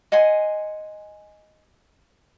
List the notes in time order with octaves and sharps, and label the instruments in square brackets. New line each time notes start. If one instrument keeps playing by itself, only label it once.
[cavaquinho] D#5 F#5 G#5 C6